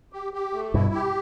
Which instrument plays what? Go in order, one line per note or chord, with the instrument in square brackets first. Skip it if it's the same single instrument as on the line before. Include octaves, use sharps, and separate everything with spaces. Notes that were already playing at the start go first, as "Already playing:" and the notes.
[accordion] G4
G4
A3
[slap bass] G2 B2 [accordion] E4
[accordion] G4